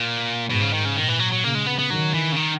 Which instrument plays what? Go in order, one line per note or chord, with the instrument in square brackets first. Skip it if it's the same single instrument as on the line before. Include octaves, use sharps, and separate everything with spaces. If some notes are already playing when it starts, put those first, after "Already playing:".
Already playing: [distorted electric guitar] A#2
[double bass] G#2 [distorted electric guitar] B2
[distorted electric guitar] C#3
D#3
C#3
[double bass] A#2 [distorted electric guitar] D#3
[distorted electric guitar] E3
F#3
F#3
[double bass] C#3 [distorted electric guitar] A#3
[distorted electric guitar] G#3
B3
B3
[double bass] D#3 [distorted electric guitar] F#3
[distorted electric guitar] E3
C#3
D#3